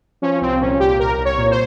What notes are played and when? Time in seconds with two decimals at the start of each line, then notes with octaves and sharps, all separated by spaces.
0.22 F3 C#4
0.41 C2 C4
0.61 A#2 C#4
0.80 C2 G4
0.99 C2 A#4
1.18 C2
1.25 C#5
1.37 A#2
1.51 C5